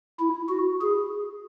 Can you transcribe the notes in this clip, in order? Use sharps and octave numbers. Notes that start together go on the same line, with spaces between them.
E4
F#4
G#4